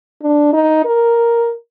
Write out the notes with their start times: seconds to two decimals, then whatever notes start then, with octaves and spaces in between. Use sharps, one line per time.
0.22 D4
0.53 D#4
0.85 A#4